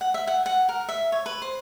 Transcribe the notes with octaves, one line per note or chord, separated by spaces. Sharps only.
F#5
E5
F#5
F#5
A#4
E5
C#5
B4
C5